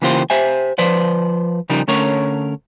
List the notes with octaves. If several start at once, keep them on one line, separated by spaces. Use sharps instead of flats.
C#3 E3 A#3 F4 G4 C5
G4 C5 E5 G#5
F3 B4 C5 D5
C#3 F3 G3 D#4 A#4
D3 A3 C#4 A#4 C#5